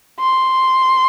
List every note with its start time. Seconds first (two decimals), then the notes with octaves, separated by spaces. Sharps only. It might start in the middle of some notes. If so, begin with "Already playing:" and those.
0.20 C6